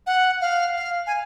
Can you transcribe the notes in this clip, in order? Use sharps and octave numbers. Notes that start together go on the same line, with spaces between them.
F#5
F5
F5
G#5